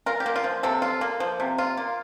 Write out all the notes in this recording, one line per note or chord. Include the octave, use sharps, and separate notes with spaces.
F4 A#4
G4
A#3
F4
F3
C3 A4
F4
A#3
F3
C3
F4
A#3